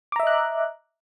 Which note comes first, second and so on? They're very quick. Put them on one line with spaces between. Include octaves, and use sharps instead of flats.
D6 A#5 E5 D#5 F#6